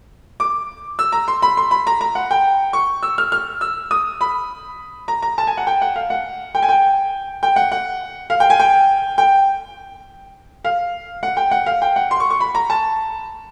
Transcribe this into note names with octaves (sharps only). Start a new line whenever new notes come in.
D6
E6
A#5
C6
B5
C6
B5
A#5
A#5
F#5
G5
C#6
E6
F6
F6
E6
D#6
B5
A#5
A#5
A5
G#5
F#5
G5
F#5
F5
F#5
G5
G#5
G5
G5
F#5
F#5
F5
G5
G#5
G5
G5
F5
F#5
G5
F#5
F5
G5
F#5
C6
C#6
C#6
B5
A#5
A5